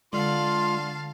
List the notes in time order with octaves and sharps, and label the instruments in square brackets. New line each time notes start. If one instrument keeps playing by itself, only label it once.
[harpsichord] D3 [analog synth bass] G#3 [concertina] F4 [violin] F5 A5